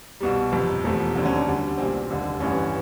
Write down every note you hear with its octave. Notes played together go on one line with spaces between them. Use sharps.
C2 B2 G3
G1 F2 C3
E1 E2 C3 F3 A3
D#2 D3 F#3 C4
C#4
D4
D2 D3 G3
B1 A#2 G3 C4
F1 D#2 D3 G3
A1 G2 E3 C#4